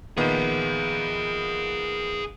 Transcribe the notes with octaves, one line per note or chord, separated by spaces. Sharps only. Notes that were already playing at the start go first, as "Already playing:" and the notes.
A#2 D#3 B3 G#4 E5